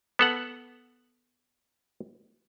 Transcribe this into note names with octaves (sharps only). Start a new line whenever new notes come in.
B3 A4 F#5